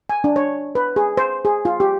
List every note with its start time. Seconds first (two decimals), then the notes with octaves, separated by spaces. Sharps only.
0.09 G#5
0.24 D4
0.36 C#5
0.75 B4
0.96 G#4
1.17 C5
1.45 G#4
1.65 F4
1.80 G4